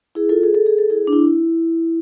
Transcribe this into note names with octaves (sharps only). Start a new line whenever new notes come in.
E4 G#4
F4 A4
G#4
A4
G#4
A4
E4 G#4
D4
E4